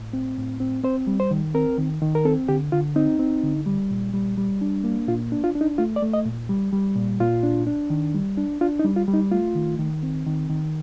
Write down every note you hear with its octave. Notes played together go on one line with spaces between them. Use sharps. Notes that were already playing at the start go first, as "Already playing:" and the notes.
Already playing: A2
C4
A2
C4
C4 C5
G3
C5
D#3
C4 A#4
D#3
D#3
A#4
C4 A4
D3 G4
D3 F4
C4 D#4
C4
D3
G3
A#2
G3
G3
D4
A#3
A#2 F4
D4
F4
D4
D#4
A3 F4
D5
A3
D#5
A#2
G3
G3
A#2
A#2 F4
D4
D4
D#3
G3
D4
D4 F4
D#4
G3
F4
G3
D#4
A3 F4
D#3
D#3
C4
D#3
D#3